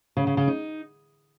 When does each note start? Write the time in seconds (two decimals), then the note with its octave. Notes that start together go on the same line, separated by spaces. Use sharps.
0.17 C#3
0.27 C#3
0.37 C#3
0.48 D#4